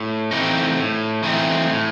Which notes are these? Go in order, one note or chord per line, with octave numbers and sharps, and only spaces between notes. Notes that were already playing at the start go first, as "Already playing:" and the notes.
Already playing: A2
E3 A3 C4 D#4
A2
E3 A3 C4 D#4
A2